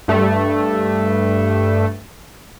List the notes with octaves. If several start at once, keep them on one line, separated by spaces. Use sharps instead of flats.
G2 A3